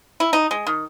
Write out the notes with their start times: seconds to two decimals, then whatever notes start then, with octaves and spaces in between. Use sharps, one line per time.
0.20 E4
0.33 D#4
0.51 G#3
0.67 D#3